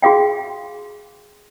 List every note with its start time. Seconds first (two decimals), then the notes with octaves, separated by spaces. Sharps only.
0.02 F#4 G#4 F5 G5